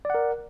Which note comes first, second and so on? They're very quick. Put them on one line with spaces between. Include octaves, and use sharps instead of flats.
D5 F#5 A#4